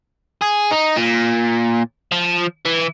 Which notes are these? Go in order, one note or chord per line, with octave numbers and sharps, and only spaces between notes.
G#4
D#4
A#2
F3
E3